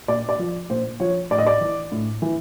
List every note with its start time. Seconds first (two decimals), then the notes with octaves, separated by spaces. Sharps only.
0.08 A#2 D5
0.29 D5
0.39 F3
0.70 A#2 C5
1.00 F3 C#5
1.31 A2 D5
1.38 D#5
1.47 D5
1.61 E3
1.92 A2
2.22 E3